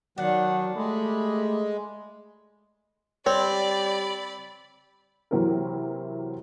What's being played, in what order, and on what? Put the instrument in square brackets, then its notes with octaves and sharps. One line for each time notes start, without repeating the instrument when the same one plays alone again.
[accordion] D#3 [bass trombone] F#3 [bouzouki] D4 [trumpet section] F#5
[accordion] G#3 [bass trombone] A3 [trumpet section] G4 D#5 B5
[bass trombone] G3 [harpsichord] C4 [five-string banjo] C#5 [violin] D5 B5
[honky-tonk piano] C3 E3 F#3 C4 E4 A#4